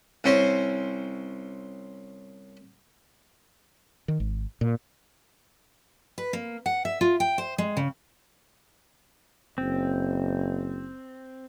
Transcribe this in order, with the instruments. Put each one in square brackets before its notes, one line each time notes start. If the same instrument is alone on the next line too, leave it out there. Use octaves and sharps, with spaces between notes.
[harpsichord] C2 C4 C#4 C5
[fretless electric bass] D#3
G#1
A#2
[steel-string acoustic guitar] B4
A#3
F#5
E5
F4
G5
C5
G#3
C#3
[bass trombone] F#1 [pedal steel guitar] C4